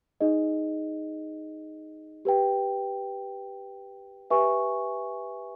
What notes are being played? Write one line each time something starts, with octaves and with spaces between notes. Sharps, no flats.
D#4 G#4 D#5
G4 B4 G5
G4 B4 E5 G#5 C#6